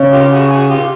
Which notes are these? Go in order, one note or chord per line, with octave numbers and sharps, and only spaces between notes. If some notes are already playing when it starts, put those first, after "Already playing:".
Already playing: C#3
F4 G4
F#4 G#4
F#4 G#4
F4 G4